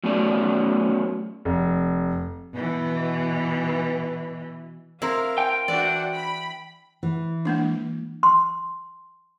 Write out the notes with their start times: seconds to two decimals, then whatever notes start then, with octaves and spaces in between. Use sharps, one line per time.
0.04 F#3 A3 B3 C#4 G4 D5
1.45 F1
2.55 B2 E3
5.02 C4 E4 A#4 F5
5.38 G5
5.68 E3 D4 F#4 D5 F#5
6.13 B5
7.03 E3
7.45 G#3 A#3 D4
8.23 C6